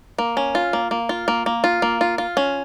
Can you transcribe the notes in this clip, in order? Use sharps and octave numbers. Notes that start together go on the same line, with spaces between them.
A#3
C#4
F4
A#3
A#3
F4
A#3
A#3
F4
A#3
F4
F4
C#4